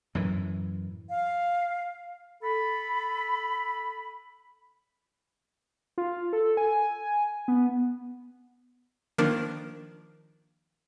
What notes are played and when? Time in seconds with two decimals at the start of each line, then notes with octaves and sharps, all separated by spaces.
0.15 F#2 A2 E3
1.08 F5
2.43 A4 B5
5.98 F4
6.33 A4
6.57 G#5
7.48 B3
9.18 D#3 F3 A#3 D4 A#4